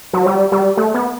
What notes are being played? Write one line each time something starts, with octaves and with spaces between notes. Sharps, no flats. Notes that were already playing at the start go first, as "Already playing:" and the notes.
F#3
G3
G3
A3
B3